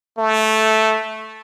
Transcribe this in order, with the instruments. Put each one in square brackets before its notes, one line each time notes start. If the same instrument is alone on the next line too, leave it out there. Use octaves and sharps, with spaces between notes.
[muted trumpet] A3